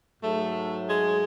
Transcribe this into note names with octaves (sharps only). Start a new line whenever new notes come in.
G#2 F#3 A3
G#3